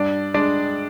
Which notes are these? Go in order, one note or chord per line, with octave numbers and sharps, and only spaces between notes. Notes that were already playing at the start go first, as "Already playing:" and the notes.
Already playing: G2 D4 D5
G#3 D4 D5